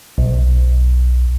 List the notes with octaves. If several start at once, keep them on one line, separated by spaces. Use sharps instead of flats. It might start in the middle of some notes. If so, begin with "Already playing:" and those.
B1